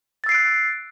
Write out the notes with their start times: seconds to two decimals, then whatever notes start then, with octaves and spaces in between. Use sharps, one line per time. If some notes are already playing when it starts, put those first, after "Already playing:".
0.24 A6
0.26 E6
0.29 C7
0.32 D7
0.34 F#6